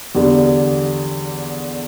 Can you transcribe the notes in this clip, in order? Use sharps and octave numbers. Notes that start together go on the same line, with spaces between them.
E2 D3 G3